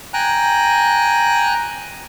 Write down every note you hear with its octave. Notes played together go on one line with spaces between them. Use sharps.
G5 G#5 A#5 F#6